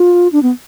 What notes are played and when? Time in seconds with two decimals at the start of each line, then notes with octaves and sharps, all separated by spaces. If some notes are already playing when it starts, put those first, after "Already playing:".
Already playing: F4
0.33 D4
0.43 B3